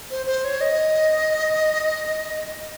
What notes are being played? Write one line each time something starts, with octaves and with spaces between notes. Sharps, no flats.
C5
C5
C#5
D#5